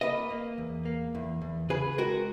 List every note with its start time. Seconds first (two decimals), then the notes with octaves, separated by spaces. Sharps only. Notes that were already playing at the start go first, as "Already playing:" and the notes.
0.01 A#3 B4 D#5
0.30 A#3
0.58 E2
0.85 A#3
1.15 E2
1.42 E2
1.69 C#3 G#4 B4
1.98 G#3 F#4 A#4